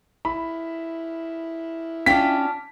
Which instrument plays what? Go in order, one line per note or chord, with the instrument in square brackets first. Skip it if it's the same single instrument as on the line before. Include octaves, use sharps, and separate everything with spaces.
[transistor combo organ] E4 [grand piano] B5
[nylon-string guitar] C#4 G5 [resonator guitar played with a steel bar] D4 F4 [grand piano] B6